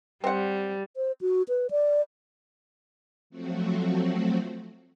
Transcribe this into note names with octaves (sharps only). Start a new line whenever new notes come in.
G3 C4 F#5
C5
F#4
B4
D5
F3 F#3 A3 C4 F#4